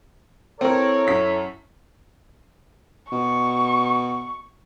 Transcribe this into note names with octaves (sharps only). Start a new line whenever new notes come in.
C4 E4 A4 A#4 C#5
F#2 B6
B2 C#6